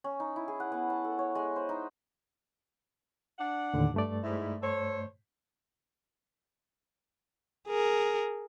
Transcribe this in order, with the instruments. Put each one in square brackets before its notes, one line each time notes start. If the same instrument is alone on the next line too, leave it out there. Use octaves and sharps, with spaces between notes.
[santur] C#4
D#4
E4
G#4
F#5
B3
A5
A4
C#5
G#3
C5
D#4
[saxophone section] D4 D5 F#5
[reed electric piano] D#2 A2 D3
G2 A3 D5
[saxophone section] G#2 E4
A4 C5 C#5
[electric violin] G#4 A#4